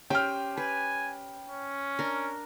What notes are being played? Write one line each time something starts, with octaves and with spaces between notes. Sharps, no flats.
C#4 G4 C5 G5 F6
B4 G#5
C#4
D4 A#4